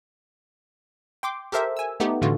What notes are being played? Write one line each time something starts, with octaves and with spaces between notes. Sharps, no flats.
G5 C6 D6
G4 A4 A#4 C5 E5
G#5 E6
A3 B3 D#4 G4
A2 D3 E3 F4 F#4